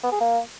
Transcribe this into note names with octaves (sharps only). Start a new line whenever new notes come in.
B3
G#4
A#3